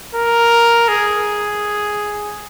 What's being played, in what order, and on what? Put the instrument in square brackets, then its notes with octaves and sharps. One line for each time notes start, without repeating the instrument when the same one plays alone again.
[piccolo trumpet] A#4
G#4